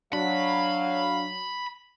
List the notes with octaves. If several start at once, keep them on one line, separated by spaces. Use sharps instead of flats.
F#3 D4 F5 B5